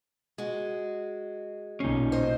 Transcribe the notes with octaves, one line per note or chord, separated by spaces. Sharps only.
G#3 F#4
B1 A#2 C#4 D#4 C7
C5 D#5